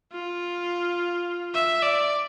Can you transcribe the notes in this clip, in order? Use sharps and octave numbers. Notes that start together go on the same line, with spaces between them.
F4
E5
D5